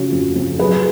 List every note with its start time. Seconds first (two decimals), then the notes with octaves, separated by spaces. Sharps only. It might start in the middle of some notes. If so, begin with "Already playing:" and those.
Already playing: C#3 F3 F#4
0.12 F2
0.36 F2
0.59 F#3 G#4 B4